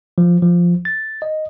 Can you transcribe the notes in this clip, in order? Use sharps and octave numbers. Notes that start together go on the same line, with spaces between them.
F3
F3
A6
D#5